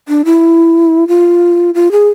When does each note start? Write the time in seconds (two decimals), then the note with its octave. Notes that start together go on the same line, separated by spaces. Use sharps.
0.09 D4
0.25 E4
1.08 F4
1.75 F4
1.92 G#4